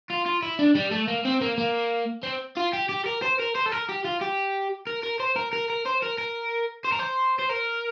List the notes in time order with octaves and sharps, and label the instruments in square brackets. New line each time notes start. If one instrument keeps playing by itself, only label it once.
[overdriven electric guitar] F4
F4
E4
D4
G3
A3
A#3
C4
A#3
A#3
C4
F4
G4
G4
A#4
C5
A#4
C5
A4
A#4
G4
F4
G4
A#4
A#4
C5
A#4
A#4
A#4
C5
A#4
A#4
C5
A#4
C5
C5
A#4